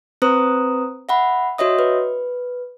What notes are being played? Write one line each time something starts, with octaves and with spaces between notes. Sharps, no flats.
C4 B4 C5 A#5 D#6
E5 F#5 B5
F#4 C#5 D#5 E5 D#6
B4